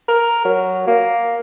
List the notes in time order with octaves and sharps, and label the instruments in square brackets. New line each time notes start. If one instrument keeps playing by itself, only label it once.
[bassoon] A#4
F#3
A#3